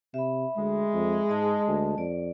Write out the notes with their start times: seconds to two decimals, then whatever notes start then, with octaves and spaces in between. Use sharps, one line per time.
0.14 C3 E5 B5
0.57 D2 G#3
0.93 F2
1.29 G#2 D#5 A5
1.68 D2
1.98 F2 D5